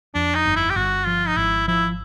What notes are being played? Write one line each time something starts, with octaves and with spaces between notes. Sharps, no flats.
F2 D4
D#4
G1
E4
G4
G1 F#4
F3 F4
D#4
G#1 E4
F3 E4